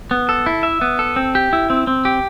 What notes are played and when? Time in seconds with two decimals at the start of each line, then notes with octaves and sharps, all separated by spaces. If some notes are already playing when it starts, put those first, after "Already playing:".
0.11 B3
0.29 A4
0.46 E4
0.63 E5
0.81 B3
0.99 A4
1.16 C4
1.35 G4
1.53 E4
1.70 C4
1.87 C4
2.05 G4